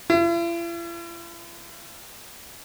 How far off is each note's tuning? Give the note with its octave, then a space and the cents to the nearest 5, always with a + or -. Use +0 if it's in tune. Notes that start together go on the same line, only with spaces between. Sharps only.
E4 +45